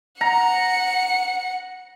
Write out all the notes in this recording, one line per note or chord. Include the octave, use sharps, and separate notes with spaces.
F#5 A#5 C#7